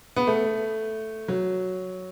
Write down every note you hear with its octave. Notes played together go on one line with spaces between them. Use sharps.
B3
A3
F#3